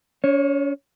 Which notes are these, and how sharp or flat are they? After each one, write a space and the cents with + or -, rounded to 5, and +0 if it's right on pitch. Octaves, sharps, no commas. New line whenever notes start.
C#4 +40 C#5 -15